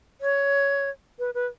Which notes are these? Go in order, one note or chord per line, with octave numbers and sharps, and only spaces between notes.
C#5
B4
B4